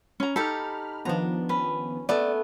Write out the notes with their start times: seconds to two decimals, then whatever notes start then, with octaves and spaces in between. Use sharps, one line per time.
0.20 C#4 A#5
0.36 D#4 G4 A4 B5 F6
1.05 D#3 F3 B3 D4 A#5
1.49 C#4 B4
2.09 A3 B3 D5